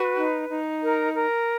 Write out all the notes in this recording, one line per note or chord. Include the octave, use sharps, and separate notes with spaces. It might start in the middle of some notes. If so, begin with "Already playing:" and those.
Already playing: F#4 B4
D#4
D#4
A#4
A#4